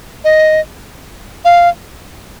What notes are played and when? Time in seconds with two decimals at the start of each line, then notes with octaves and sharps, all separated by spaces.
0.24 D#5
1.45 F5